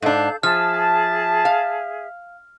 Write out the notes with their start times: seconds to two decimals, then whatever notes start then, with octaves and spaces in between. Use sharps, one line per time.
0.02 G#2 D4 A4 F5 G6
0.43 F3 G#4 E5 A5 F6
1.45 F5